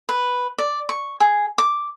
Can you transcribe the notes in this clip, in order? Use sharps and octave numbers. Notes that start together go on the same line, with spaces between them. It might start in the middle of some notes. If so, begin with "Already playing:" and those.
B4
D5
C#6
G#4
D6